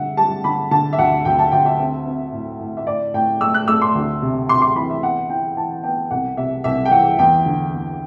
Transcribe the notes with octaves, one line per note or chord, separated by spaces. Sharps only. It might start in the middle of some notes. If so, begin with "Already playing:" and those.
Already playing: D3 G3 E5 F#5
G3 A5
D3 B5
D3 A5
E5
D2 F#5
D2 G5
A5
D2 G5
E5
C4
C4
A2
A2
E5
A2 D5
A2 G5
A3 E6
F#6
A3 E6
C6
D2
C3
C3 C6
C6
E3 B5
E5
B3 F#5
E3 G5
E3 A5
B3 G5
C2 F#5
C3 E5
C2 E5
G5
E3 F#5
E2 G5
D3
E2